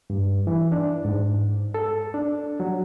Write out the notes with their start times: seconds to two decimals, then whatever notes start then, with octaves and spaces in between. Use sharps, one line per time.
0.10 G2
0.47 E3
0.72 D4
1.05 G#2
1.74 A4
2.14 D4
2.60 F#3